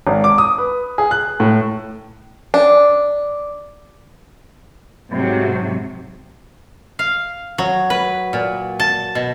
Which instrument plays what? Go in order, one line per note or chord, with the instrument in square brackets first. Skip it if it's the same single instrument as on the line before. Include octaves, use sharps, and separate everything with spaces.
[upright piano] G#1
D6
D#6
B4
G#4
F#6
A2
[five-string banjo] D4
[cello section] G#2 C3 F#3
[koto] F5
F#3
B4
A#2
A5
B2